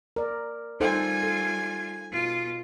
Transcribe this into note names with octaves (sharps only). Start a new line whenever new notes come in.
A#4 D5
G3 D#4 F4 A4 C5 G#5
A4
B2 F4